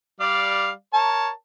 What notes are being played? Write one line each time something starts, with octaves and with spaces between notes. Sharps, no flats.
G3 D5 F5
A#4 C#5 A5